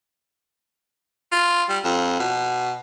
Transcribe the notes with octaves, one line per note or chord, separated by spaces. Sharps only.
F4
G3
F2
B2